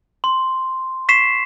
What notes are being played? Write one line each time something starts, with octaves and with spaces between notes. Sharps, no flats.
C6
C#6 B6 C7 E7